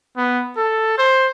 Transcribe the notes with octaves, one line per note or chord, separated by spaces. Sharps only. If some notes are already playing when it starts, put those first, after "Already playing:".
B3
A4
C5